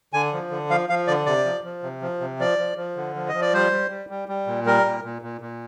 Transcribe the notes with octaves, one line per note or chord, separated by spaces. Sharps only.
D3 G#5
F3
D3
F3 F5
F3 F5
D3 D5
C3 D5
F3
F3
C3
F3
C3
F3 D5
F3
F3
D3
F3
D#5
F3
D5
G3 C5
G3
G3
G3
G3
A#2
G3 A#4
A#2
A#2
A#2
A#2